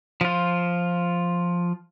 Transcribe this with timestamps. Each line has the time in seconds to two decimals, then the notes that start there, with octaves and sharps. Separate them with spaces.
0.21 F3 F4